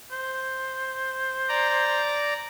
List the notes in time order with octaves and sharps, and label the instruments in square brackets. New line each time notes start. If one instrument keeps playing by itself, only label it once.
[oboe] C5
[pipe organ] D5 A#5